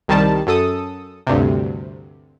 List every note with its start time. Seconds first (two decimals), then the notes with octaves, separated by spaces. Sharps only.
0.08 C2 D#3 G3 A5
0.47 F#2 A4 D#6
1.27 D2 G2 C3